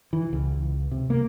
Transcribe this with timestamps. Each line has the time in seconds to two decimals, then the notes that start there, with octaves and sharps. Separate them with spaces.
0.13 E3
0.33 C#2
0.91 C3
1.10 A#3